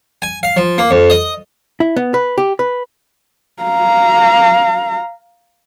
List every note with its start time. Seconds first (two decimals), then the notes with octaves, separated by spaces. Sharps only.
0.22 G#5
0.43 F5
0.57 F3
0.78 A#3
0.91 F2
1.10 D#5
1.80 E4
1.96 B3
2.14 B4
2.38 G4
2.59 B4
3.63 F5 A#5